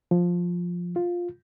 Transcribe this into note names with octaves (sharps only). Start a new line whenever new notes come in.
F3
F4